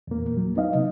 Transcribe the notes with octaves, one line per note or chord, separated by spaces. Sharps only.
E2 A#2 A#3
F#3
B3 D#4 D#5 F5
C3